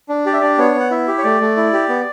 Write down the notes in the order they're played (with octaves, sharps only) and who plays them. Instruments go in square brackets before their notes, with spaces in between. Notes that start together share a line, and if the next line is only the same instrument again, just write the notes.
[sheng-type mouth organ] D4
G4 D5
E5
D4 D5
B3 C#5
B3 F#5
E4 E5
G4
C#5
A3 D5
A3
E4
G4
B3